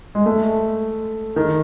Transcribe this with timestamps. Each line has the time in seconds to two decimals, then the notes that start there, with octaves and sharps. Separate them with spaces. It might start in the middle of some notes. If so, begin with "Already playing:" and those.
0.15 G#3
0.26 A3
1.36 D#3